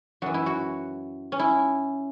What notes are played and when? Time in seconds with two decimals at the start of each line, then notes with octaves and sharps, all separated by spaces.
0.22 F#2 E3 F#4
0.34 E4
0.46 F#4
1.32 C#4
1.39 E4